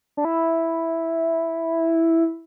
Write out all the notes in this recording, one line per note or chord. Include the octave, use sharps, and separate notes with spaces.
D4
E4